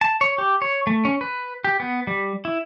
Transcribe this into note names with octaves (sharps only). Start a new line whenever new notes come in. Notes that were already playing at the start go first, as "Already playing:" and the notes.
A5
C#5
G4
C#5
A3
C#4
B4
G4
B3
G3
E4